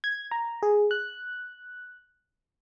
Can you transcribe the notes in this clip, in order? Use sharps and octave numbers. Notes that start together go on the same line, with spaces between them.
G#6
A#5
G#4
F#6